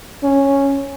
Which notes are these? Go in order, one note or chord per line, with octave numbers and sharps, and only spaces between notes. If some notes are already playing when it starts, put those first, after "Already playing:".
C#4